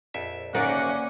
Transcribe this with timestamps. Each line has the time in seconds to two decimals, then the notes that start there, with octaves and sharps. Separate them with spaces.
0.14 A#1 F2 E5
0.55 G#1 D2 A#3 C#4 D#4 D5 F#5